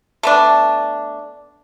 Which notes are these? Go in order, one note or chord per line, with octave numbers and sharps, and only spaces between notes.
A3 B3 D4